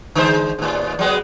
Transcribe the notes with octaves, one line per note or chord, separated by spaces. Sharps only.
D3 G#3 C5
D#2 A2
F#3 G#3 B3